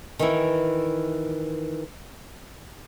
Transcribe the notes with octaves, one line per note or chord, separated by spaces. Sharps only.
D#3 E3 E4